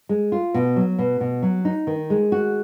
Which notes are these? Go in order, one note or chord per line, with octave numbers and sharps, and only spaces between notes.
G#3
F4
B2
F#3
B2
B2
F#3
D#4
D#3
G#3
F#4